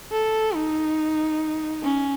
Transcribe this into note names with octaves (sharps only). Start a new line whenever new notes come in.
A4
D#4
C#4